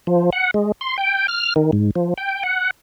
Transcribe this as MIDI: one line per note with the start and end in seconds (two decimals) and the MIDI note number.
0.07 0.30 53
0.33 0.51 78
0.54 0.72 56
0.81 0.97 84
0.98 1.27 79
1.28 1.54 89
1.56 1.71 51
1.72 1.91 44
1.96 2.14 53
2.18 2.43 79
2.43 2.71 78